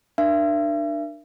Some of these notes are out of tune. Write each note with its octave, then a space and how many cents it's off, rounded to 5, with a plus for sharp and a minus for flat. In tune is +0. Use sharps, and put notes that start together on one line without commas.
D4 +30 A#4 +15 E5 +40